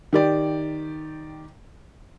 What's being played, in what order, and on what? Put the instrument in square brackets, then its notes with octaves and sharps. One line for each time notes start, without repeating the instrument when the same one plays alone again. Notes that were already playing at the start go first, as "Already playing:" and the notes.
[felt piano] D#3 G4 D5